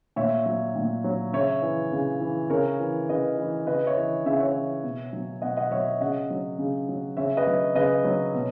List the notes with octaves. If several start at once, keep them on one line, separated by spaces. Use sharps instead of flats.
A#2 C#5 E5
F#3
A#2
F#3
C#3 C#5 E5
E3
C#3
E3
C#3 A#4 C#5
E3
C#3 B4 D#5
E3
C#3 B4 D#5
C#5 E5
E3
C#3 E5
F#5
C#5 E5
E3
B2
F#3
B2 D#5 F#5
D#5 F#5
F#3 C#5 E5
C#3 D#5 F#5
F#3
C#3
F#3
C#3 C#5 E5
B4 D#5
F#3
C#3 B4 D#5
F#3
B2